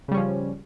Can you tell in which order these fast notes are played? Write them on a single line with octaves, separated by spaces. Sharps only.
C#3 G3 C#4 F3